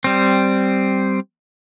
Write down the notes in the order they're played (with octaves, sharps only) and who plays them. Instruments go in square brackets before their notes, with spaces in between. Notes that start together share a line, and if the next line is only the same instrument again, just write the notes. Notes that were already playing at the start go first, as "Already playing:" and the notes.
[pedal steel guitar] G3 C4